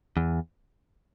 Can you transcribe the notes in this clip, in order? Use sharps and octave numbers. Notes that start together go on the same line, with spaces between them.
E2